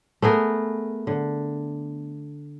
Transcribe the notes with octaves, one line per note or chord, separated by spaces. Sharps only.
A3 B3 G#4 A#4
D3